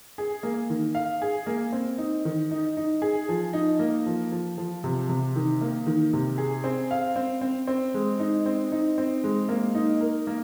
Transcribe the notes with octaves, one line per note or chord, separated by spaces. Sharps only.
G#4
A#3
D#3
F5
G#4
A#3
C4
D#4
D#3
D#4
D#4
G#4
F3
D#4
A#3
F3
F3
F3
C3
C3
D#3
A#3
D#3
C3
G#4
C4
F5
C4
C4
C4
G#3
D#4
C4
D#4
C4
G#3
A#3
D#4
A#4
A#3